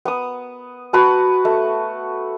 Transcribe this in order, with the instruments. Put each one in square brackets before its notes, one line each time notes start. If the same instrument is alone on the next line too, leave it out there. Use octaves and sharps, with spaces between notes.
[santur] B3 D#6
F#4 B4 A5
A3